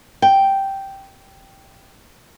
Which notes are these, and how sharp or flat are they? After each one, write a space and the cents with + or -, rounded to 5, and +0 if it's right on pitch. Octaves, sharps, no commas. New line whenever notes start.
G5 -5